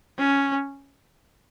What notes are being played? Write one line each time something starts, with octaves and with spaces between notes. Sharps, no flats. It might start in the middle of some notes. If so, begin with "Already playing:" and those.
C#4